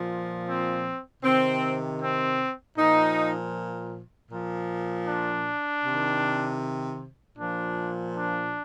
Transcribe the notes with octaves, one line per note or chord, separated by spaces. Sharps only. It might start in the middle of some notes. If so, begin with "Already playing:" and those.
Already playing: A#2 F3
C4
C3 D#3 C4
C4
A#2 F3 D#4
A#2 F3
D4
C3 D#3
A#2 F3 D4
D4